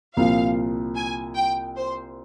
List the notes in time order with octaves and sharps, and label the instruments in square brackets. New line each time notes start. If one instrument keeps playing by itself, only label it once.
[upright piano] C2 A#2 F3 [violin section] F5
[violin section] G#5
G5
C5